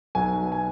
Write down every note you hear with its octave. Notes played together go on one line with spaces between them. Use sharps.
B1 B2 F#3 B3 G#5
G#5